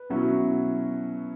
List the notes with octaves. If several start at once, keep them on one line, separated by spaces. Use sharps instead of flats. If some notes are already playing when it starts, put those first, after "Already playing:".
Already playing: B4
B2 F#3 C#4 E4